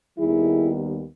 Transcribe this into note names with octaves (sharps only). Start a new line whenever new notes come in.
D#2 D#3 G3 B3 E4 G#4